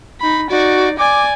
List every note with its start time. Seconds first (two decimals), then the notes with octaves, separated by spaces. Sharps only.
0.21 D#4 B5
0.50 D#4 F#4 D5
0.98 D5 G#5 D6